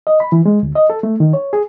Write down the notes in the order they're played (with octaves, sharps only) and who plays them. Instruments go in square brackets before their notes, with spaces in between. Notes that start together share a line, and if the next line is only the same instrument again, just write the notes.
[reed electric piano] D#5
B5
E3
G#3
D2
D#5
A4
A3
D#3
C#5
G#4